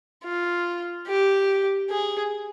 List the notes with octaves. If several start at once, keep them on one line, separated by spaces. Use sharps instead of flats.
F4
G4
G#4